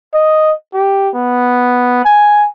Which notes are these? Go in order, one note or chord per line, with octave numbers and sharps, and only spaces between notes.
D#5
G4
B3
G#5